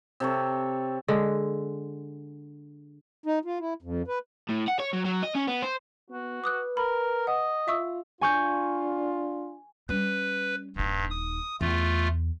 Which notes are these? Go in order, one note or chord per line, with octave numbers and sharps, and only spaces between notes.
C3 A4 C#5
D3 G#3
D#4
F4
E4
F2
B4
A2
F#5
C#5
F#3
F#3
D#5
C#4
B3
C5
B3 F#4
B4 D6 D#6 F#6
A#4 B5
D#5 F#5
F4 E5 C#6 E6
D4 F4 G#5 C#6 G6
G3 C#4 B4
D#1 G2 D#4
D#6
E2 A3 F4